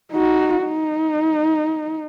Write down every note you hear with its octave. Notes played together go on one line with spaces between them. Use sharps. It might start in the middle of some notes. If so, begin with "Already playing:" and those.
D#4 F#4
D#4